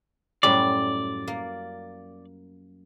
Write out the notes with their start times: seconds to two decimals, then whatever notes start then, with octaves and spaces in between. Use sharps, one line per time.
0.43 F#2 A2 G3 D5
1.28 A#3